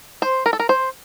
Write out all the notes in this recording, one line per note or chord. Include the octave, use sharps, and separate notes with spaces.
C5
A#4
A4
A#4
C5